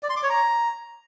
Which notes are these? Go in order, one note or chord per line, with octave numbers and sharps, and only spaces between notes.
D5
C6
D6
C#5
A#5